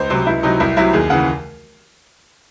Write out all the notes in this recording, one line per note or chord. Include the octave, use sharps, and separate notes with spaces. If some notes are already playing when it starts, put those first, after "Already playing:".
Already playing: C#2 C5
C3 F#3 C5
C#2 E4
C3 F#3 D#4
C2 E4
C3 F#3 E4
D#2 G#4
C#3 E3 F#5